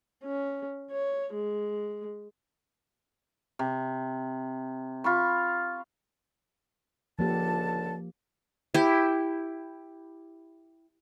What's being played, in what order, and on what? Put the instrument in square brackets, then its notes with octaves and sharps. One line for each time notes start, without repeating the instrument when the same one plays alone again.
[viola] C#4
C#5
G#3
[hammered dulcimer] C3
F4 B5 C#6
[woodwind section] C#2 D3 A5 [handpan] F3 A#3 G4
[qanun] E4 G4